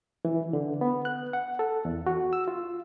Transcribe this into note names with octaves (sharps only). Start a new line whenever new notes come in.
E3
D3
B3
F#6
F#5
A4
E2
F#4
E6
F4